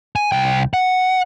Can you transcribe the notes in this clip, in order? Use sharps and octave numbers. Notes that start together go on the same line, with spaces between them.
G#5
C2 G5
F#5